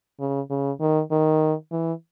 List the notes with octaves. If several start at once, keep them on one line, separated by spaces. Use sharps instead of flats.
C#3
C#3
D#3
D#3
E3